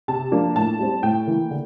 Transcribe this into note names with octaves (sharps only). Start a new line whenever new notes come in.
C3 A5
F3 A#3 D4
A2 A5
G3 C4
A2 G5
E3 A#3
D3